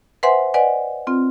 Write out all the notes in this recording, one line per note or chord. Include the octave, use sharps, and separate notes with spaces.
B4 C5 E5 F#5 G#5 C6
B4 D5 D#5 F#5 G#5
C4 F4